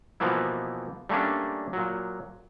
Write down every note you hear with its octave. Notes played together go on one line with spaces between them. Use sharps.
B2 E3 F3 A#3 B3 E4
G3 A3 A#3 C#4 D4
A#2 F#3